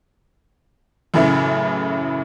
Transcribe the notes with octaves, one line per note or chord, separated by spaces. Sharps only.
F#2 A2 C#3 E3 A3